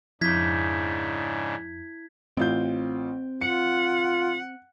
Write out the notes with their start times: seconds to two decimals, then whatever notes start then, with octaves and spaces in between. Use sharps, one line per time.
0.21 F2 G#2 C#3 D4 E4 G6 G#6 B6
2.37 A1 C4 F4 G6
3.41 F4 F#5 C#7